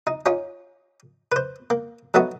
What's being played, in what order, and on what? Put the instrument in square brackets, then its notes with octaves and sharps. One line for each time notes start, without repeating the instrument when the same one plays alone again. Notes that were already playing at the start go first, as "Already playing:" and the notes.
[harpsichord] D#4
C#4 D#4 F4
B4 C5
A#3
F#3 A3 B3 D#4 F#4